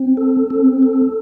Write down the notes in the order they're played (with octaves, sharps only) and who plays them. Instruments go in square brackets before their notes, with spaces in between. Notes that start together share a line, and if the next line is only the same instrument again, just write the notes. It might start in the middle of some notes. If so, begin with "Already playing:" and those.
Already playing: [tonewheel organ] C4
A4
C4
A4